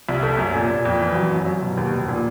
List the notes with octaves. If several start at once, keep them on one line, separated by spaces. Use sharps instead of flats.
C2
A3
F#2
A#2
A#2
F2
E3
F#3
F#2
F#3
B2
D#2
F1
A#2